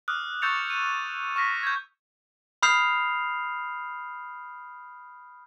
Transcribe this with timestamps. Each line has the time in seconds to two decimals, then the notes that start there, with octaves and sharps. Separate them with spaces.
0.08 D6 D#6 F6 F#6
0.42 C#6 E6 G6 A6 C#7 F7
0.70 D#7
1.36 C#6 F6 A#6 B6
1.63 G6 G#6
2.62 B5 D#6 F6 G6 C7 F7